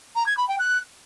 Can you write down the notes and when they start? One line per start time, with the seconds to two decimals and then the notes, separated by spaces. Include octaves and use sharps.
0.15 A#5
0.26 G#6
0.37 B5
0.48 G5
0.59 F#6